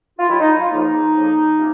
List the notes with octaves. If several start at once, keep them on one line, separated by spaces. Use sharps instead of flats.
F4
D#2 D#3 F#3 E4
D#4
F4
C#2 C#3 F3 A#3 D#4
F2 C#3 F3 A#3
C3 F3 A#3 C#4